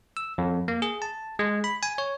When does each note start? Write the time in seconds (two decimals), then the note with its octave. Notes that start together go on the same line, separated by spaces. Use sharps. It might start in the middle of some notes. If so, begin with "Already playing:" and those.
0.17 E6
0.38 F2
0.68 A#3
0.82 G#4
1.02 A5
1.39 G#3
1.64 B5
1.83 G#5
1.98 C#5